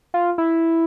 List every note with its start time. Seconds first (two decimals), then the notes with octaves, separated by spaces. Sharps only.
0.14 F4
0.38 E4